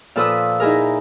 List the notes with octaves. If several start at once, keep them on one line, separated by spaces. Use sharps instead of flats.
A#2 F3 A4 B4 D#6 E6
D#4 E4 G#4 A#4